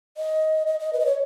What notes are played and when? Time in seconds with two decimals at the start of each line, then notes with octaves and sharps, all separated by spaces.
0.17 D#5
0.67 D#5
0.80 D#5
0.93 B4
1.00 D#5
1.06 C#5